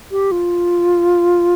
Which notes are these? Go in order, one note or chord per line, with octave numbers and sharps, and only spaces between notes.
G4
F4